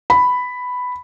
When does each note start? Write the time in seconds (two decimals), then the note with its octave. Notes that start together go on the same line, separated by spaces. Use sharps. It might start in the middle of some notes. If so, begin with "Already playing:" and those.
0.10 B5